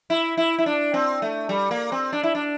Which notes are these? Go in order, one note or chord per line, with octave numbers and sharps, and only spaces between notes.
E4
E4
E4
D4
C4
A3
G3
A#3
C4
D4
E4
D4